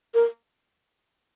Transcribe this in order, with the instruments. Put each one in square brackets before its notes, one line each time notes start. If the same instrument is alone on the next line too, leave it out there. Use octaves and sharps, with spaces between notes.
[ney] A#4